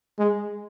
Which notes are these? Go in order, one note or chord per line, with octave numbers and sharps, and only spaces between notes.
G#3